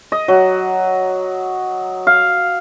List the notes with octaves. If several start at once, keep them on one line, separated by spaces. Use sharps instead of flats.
D#5
F#3
F5